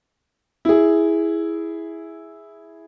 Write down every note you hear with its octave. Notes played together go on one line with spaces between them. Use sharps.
E4 G#4